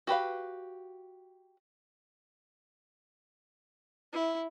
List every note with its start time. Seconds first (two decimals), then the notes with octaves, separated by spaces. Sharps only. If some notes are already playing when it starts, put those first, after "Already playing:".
0.07 F#4 G4 B4 F5
4.13 E4